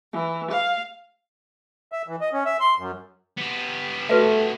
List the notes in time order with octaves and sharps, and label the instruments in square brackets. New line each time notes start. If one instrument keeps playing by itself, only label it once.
[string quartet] E3
F5
[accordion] E5
E3
D#5
C#4
E5
C6
F#2
[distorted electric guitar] B3 G4
[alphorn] A3 [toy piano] F#4 B4 E5